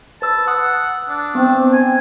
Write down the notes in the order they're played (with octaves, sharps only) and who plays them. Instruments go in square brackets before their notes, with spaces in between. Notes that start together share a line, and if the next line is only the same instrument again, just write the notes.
[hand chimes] B4 E6 [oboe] A5
[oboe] F#5 [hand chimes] D#6 E6
[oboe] D4
[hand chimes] B3 [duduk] C4
[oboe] G#5